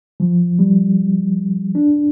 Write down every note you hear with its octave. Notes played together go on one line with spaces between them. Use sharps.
F3
G3
D4